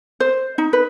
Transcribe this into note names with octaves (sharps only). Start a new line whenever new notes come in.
C5
D#4
B4